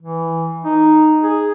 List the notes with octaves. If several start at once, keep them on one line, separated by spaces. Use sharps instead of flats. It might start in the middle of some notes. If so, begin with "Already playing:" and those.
E3
D#4
G#4